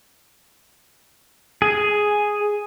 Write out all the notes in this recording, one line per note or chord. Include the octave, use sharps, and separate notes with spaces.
G#4